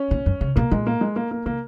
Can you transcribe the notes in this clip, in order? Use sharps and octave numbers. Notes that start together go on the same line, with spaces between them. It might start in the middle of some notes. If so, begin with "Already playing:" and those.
Already playing: C#4
A#2
F#2
C#3
B2 A#3
A#2 G#3
A#3
G#3
A#3
A#3
C#3 A#3